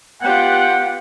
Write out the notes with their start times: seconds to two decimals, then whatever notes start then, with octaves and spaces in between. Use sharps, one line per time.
0.22 B3 F4 G4 F#5 G5